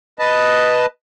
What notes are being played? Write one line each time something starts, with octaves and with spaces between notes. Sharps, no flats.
B4 D#5 A5